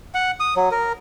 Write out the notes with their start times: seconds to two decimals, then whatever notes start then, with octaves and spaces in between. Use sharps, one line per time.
0.15 F#5
0.40 D#6
0.56 F#3
0.71 A#4